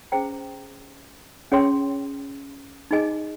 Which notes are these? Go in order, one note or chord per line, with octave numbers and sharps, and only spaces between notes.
C#4 G#4 C5 G5 A#5
C#4 G#4 C#5 G5 C6
D#4 G#4 D#5 G#5